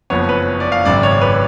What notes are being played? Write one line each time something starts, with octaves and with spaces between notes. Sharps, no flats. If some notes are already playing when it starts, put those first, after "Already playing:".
F#1 F2 F3 B3 C#5
B4
D5
F5
G#1 F#2 C#3 D5
C#5
B4